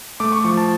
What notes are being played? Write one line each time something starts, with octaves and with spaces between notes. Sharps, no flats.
A3 D6
C#6
F3 C#6
A5